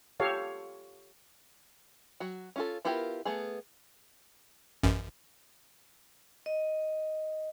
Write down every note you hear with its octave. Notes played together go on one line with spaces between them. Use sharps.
F4 G4 A4 C#5 F5
F#3 F#4
C#4 F4 A4
B3 E4 F4 G4 A#4
A3 B3 G#4
A1 F#2
D#5